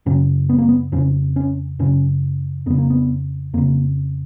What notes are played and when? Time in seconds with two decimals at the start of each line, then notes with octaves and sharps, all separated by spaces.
0.06 F#2 C#3 C#4
0.49 B3
0.58 A#3
0.69 B3
0.92 F2 C#3 C#4
1.36 C#4
1.79 F#2 C#3 C#4
2.66 F2 C#3 B3
2.78 A#3
2.90 B3
3.54 F2 C#3 A#3